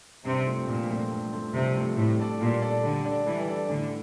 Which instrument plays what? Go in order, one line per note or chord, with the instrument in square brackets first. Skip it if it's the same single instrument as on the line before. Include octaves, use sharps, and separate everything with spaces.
[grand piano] G2 [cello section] C3
[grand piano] F3 A3 C4
[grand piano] G2 [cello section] A#2
[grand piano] F3 A3 C4
G2
F3 A3 C4
[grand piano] G2 [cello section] C3
[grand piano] F3 A3 C4
[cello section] A2 [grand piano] G3
[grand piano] D4 A4 D5
[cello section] A#2 [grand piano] G3
[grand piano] D4 A4 D5
[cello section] D3 [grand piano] G3
[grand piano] D4 A4 D5
[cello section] E3 [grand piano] G3
[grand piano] D4 A4 D5
[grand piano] A2 [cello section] D3